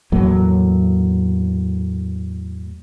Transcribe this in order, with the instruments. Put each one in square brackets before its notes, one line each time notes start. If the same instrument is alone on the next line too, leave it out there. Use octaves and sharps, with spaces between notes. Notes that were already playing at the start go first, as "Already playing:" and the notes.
[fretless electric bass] E2 A2 F#3 A#3